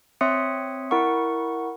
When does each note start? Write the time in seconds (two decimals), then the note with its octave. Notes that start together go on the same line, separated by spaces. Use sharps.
0.21 C4 C#5 E5 C6 D#6 C#7
0.91 E4 A#4 F#5 C#6